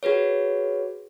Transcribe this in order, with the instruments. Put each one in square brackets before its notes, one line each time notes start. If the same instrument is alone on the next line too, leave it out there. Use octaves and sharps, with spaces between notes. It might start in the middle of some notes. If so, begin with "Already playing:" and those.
[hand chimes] F#4 G#4 B4 C#5